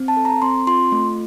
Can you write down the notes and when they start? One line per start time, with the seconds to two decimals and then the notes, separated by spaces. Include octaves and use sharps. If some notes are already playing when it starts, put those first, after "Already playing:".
Already playing: C4
0.08 A5
0.17 A4
0.25 A#5
0.42 C4 C6
0.67 F4 C6
0.92 A3